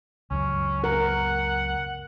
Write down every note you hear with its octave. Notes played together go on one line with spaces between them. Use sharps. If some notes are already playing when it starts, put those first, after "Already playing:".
C#2 F#2 C#3 C#4
A#4 F#5